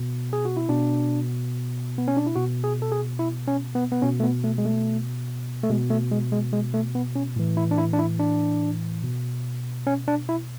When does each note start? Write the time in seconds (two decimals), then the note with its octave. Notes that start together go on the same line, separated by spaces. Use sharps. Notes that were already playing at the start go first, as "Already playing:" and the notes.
Already playing: B2
0.33 G#4
0.45 F#4
0.57 E4
0.69 B2 D4
1.98 B3
2.08 C#4
2.17 D4
2.26 E4
2.35 B2 F#4
2.64 G#4
2.82 A4
2.92 G#4
3.19 E4
3.47 C#4
3.75 B3
3.92 B3
4.02 B2 C#4
4.20 A3
4.24 B3
4.44 A3
4.58 G#3
4.65 A3
5.63 A3
5.70 B2 G#3
5.90 A3
6.11 G#3
6.32 G#3
6.53 G#3
6.74 A3
6.95 B3
7.16 C#4
7.36 A2 E3
7.57 E4
7.71 D4
7.78 E4
7.93 D4
7.99 E4
8.19 D4
9.03 B2
9.87 C#4
10.08 D4
10.29 E4